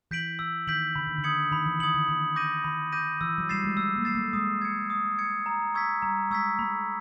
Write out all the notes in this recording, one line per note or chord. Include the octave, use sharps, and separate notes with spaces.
E3 G6 B6 D7 F#7
E3 E6
D#3 G6 B6 D7 F#7
D3 B5
D#3
D3
D#6 G#6 C#7 F#7
D#3 B5
E3
D#3 D#6 G#6 C#7 F#7
D3
D#3 B5
D6 G6 A#6 D#7
D#3 B5
D6 G6 A#6 D#7
E3 E6
F#3
G3 A6 C7 E7
G#3
A3 E6
A#3
A6 C7 E7
A3
G#3 D#6
G#6 C#7
D#6
G#6 C#7
A#5
C#6 E6 G#6 B6
G3 A#5
G#3 C#6 E6 G#6 B6
A3 B5